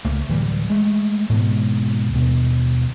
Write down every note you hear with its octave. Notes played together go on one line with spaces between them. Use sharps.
C#2 A3 A#3
D1 E3 G3
G#3 A3
G#2 B2 E3
D#2 B2